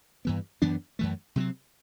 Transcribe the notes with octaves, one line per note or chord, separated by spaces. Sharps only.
G2 E3 B3
F#2 E3 B3 D4
F#2 E3 A3
C3 F#3 C4